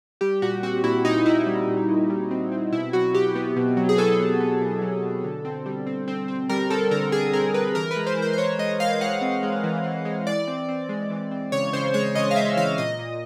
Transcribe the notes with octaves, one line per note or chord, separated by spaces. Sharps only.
G3 G4
A#2 F#4
C4 F#4
A#2 E4
A#2 D#4
A#2 E4
G3
A#2
A#2
G3
C4
C4
B2 E4
F#3 F#4
B2 G4
B3
B2
F#3
G#4
B3 A4
B3
B3
B2
F#3
B2
D3
C4
G3
C4
C4
C4
G3 A#4
C4 A4
D3 A#4
D3 G#4
C4 A#4
G3 B4
E3 A#4
B4
G#3
C5
E3
C5
C5
E3 C#5
G#3 D#5
G#3 F5
G#3 F#5
C4
G#3
E3
E3
G#3
E3 D5
C4
C4
G#3
E3
C4
C#3 C#5
C#3 C5
G#3 C#5
C#3 D#5
F5
G#3 E5
E3 F5
A#2 D#5
A#2